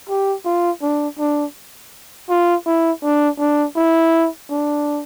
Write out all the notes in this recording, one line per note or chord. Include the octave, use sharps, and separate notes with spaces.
G4
F4
D4
D4
F4
E4
D4
D4
E4
D4